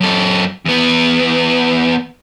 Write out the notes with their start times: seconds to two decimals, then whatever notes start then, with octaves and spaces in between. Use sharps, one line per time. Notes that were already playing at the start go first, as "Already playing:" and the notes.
0.01 F#2 A4
0.65 E2 B3